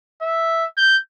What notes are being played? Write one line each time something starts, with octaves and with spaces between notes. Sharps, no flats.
E5
G6